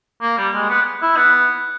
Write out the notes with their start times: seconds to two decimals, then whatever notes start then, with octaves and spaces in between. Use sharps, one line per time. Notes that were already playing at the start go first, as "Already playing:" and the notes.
0.22 A#3
0.38 G3
0.54 G#3
0.69 B3
1.02 E4
1.17 B3